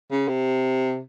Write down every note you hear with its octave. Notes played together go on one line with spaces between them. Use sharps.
C#3
C3